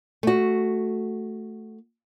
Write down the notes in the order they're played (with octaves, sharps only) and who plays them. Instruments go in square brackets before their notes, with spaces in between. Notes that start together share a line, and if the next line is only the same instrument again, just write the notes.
[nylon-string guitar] A3 F#4